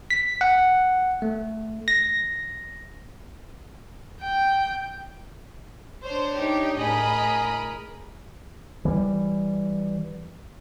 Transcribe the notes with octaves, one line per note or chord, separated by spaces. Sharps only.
B6
F#5
A3
A#6
G5
D4 C5 C#5
D#4 G4
A2 G#4 A#4 D#5 B5
E3 G3